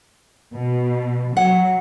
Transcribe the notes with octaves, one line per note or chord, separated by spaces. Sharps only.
B2
F#3 F#5